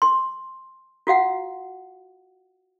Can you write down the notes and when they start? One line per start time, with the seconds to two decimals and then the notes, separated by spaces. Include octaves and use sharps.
0.02 C6
1.07 F4 F#4 F5 F#5